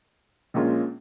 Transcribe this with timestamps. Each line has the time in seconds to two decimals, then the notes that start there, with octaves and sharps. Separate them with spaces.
0.54 A#1 A#2 G#3 C#4 F4